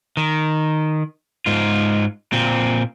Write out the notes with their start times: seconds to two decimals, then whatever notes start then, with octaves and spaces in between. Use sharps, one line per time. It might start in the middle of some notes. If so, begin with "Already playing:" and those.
0.17 D#3
1.46 G#2 F4
2.32 A#2 C4